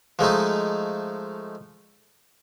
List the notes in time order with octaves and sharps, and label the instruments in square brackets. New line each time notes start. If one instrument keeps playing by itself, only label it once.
[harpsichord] F3 G#3 A3 D#4